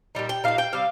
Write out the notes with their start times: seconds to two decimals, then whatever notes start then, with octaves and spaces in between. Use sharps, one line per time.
0.15 A#2 G3 D#4
0.29 G5
0.44 G3 D#4 F5
0.48 A#2
0.58 G5
0.72 C3 G3 F5